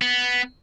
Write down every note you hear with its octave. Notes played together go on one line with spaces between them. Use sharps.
B3